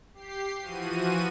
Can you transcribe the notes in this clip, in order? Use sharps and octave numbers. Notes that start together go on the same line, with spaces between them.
G4 C7
E3 F3 F#4 D#7